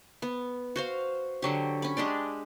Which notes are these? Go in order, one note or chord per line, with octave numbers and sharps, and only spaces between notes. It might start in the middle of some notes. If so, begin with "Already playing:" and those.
B3
F#4 C5 F5
D3 F#3 G4
C#4 B5
G#3 D4 G4 D5